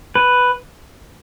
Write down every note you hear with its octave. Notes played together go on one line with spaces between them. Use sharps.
B4